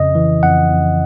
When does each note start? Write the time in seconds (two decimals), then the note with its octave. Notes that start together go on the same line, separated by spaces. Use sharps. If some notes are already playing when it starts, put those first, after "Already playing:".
Already playing: F2 C#3 D#5
0.15 E3
0.43 F2 F#5
0.71 F2